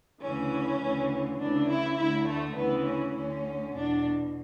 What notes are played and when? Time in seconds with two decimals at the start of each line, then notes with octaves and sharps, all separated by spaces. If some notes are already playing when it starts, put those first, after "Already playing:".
0.21 D2 C#3 E3 C#4
0.80 D2 C#3 E3
1.39 D2 C#3 E3 D4
1.68 E4
1.97 D2 D3 E4
2.27 A3
2.56 D2 C#3 E3 B3
2.85 C#4
3.15 D2 D3 C#4
3.74 E2 B2 D4